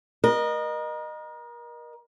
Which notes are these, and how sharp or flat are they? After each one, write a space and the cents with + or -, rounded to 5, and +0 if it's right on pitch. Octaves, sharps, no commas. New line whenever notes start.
A#4 +35 D#5 -20